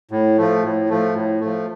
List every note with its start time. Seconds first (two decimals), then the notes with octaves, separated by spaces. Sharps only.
0.11 A2
0.37 F3 A3
0.63 A2
0.89 F3 A3
1.14 A2
1.40 F3 A3